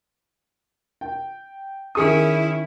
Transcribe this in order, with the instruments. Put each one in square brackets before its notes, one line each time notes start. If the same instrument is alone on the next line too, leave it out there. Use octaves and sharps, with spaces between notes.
[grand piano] G5
[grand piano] D#3 G#4 D#6 [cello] C#4 E4